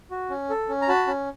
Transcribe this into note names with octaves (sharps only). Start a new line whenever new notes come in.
F#4
C#4
A4
C#4
A#5
F#4 A5 B5
C#4